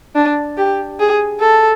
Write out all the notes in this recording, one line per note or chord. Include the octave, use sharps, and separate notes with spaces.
D4
G4
G#4
A4